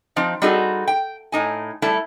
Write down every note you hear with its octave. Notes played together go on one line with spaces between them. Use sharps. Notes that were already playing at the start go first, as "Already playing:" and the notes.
F3 C4 D#4
G3 C4 D#4 F#4 G#4 A4
G5
A2 D#4 G#5
G3 A3 E4 A5